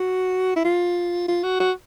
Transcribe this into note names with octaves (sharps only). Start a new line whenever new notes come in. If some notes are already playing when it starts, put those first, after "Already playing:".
Already playing: F#4
E4
F4
F4
F#4
F#4